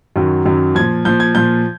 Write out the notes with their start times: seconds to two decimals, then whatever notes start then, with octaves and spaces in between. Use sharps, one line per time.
0.16 F#2 D#3 F#3
0.45 F#2 D#3 F#3
0.75 A#2 F3 G#6
1.05 A#2 F3 G6
1.20 G#6
1.35 A#2 F3 G6